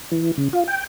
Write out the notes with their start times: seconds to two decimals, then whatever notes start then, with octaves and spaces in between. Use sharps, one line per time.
0.12 E3
0.37 C#3
0.53 F4
0.68 G5